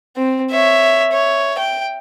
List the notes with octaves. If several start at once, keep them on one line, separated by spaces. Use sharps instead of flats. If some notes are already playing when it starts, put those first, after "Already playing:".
C4
C#5 E5
C#5
G5